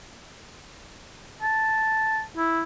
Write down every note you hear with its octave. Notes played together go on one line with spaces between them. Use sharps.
A5
E4